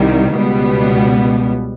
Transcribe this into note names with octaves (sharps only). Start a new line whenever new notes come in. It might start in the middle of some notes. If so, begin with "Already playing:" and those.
Already playing: C2 C3 D#3 G3
C#2 B2 G3 B3